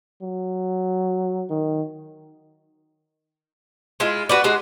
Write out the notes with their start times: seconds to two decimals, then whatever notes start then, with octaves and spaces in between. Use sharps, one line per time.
0.22 F#3
1.50 D#3
4.00 G#3 E4 F4
4.29 F#4 B4 D5
4.44 G#3 F#4 G#4